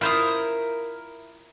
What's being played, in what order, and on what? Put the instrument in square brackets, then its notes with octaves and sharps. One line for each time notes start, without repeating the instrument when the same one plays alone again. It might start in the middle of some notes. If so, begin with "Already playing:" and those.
[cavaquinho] E4 D#6 [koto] F4 C5 F5 [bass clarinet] A#4